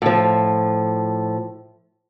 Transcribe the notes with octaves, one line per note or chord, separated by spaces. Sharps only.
A2 F3